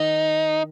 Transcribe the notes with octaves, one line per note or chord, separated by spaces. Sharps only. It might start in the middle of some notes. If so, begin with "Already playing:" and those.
Already playing: D#3 D#4